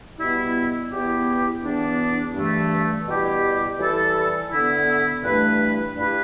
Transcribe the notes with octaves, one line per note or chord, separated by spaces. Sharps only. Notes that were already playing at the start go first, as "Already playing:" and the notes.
B2 G3 B3 E4
E2 E3 B3 E4 G4
E2 E3 B3 D4
G2 E3 A3
B2 G3 E4 G4
E3 G3 E4 A4
D3 B3 E4
G2 E3 A3 D4 B4
G2 G3 E4 G4 B4